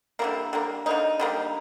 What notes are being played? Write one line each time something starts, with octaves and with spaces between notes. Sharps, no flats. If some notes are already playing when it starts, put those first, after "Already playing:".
D3 G3 A#3 E4
D3 G3 A#3
D3 G3 A#3 D#4
D3 G3 A#3